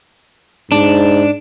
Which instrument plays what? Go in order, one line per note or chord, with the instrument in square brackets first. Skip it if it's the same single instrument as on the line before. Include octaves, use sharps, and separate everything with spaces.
[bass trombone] G#2 [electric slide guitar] D4